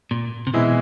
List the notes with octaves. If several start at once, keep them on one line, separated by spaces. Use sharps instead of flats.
A#2
C3
B2 E3 G#3 C4 E4